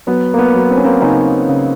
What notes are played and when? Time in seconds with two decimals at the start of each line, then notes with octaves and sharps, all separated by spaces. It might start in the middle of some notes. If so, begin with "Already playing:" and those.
0.07 F#3 B3
0.34 A#3
0.38 B3
0.55 F#3
0.71 C4
0.77 C#4
0.84 A#3 C4
1.02 C#3 C#4 D#4
1.49 C#3